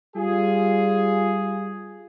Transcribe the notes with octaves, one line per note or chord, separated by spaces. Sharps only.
G3 F4 G#4